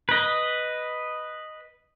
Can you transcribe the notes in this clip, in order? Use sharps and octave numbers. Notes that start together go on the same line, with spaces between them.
B4 D#5